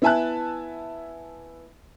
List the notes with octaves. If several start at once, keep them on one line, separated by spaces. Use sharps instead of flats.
B3 E4 E5 G#5 A5 F#6